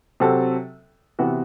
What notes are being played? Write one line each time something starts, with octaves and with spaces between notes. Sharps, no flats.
C3 F#3 C4 F#4 A4
C3 E3 B3 F#4